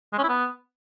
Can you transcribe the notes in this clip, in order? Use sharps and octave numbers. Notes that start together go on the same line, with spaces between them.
G#3
C#4
E4
B3